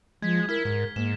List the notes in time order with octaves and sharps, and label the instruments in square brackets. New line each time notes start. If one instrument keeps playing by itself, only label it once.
[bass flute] F3 [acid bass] G#3 [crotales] G#6 B6
[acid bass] E4 [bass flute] A#4 [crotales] F6 B6
[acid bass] G#2
[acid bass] G#2 [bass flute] A#3 [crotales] E7